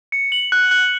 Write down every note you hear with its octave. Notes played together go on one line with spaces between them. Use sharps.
C#7
F#7
F#6
F#6